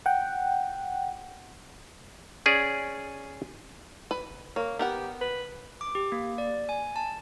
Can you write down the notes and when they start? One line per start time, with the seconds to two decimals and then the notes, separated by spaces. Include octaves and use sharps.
0.06 F#5 G5
2.46 C#4 G#4 D5
4.11 B4
4.31 F#1
4.56 A#3 C#5
4.79 B3 G4 A#4 F#5
5.21 B4
5.81 D6
5.95 G4
6.12 A#3
6.38 D5
6.69 G#5
6.96 A5